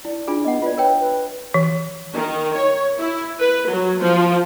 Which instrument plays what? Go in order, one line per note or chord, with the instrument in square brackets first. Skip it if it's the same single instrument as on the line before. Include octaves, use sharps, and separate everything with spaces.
[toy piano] E4 [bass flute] D5
[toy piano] D4 F4 G#4
[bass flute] B3 [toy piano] D#5 F#5
[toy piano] F4 D5 [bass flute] B4
[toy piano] A#4 C#5 G5 [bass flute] B4
[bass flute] B4
[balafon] E3
[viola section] D#3
C#5
E4
B4
F#3
F3